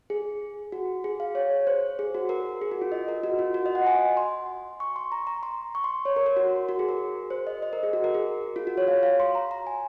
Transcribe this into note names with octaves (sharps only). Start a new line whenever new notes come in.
G#4
F#4
G#4
F5
C#5
C5
G#4
F#4
A#4
G#4
F#4
F4
D#5
A#4
F#4
F4
F#4
D#5
F#5
G#5
C6
C#6
C6
A#5
A#5
C6
C#6
C6
C#5
A#4
A#4
F#4
F#4
G#4
A#4
C5
D#5
D#5
A#4
G#4
F#4
A#4
G#4
F4
F#4
C#5
F5
F5
C6
A#5
A#5
G#5